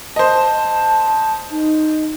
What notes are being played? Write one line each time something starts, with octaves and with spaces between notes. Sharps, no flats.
C5 D#5 A5
D#4